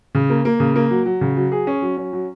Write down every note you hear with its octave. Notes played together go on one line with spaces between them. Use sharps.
C#3
A#3
A#3
C#3
A#3
F#3
F#3
C#3
F#3
G#4
C#4
F#3
C#4
F#3